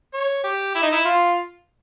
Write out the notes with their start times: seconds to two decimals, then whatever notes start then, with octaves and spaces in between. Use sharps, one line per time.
0.14 C#5
0.44 G4
0.75 E4
0.83 D#4
0.92 E4
1.05 F4